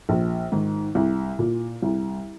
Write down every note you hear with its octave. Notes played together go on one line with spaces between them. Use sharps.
A#1
G#2 D#3
C2
A#2
C2